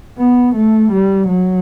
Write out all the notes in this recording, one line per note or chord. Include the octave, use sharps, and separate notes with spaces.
B3
A3
G3
F#3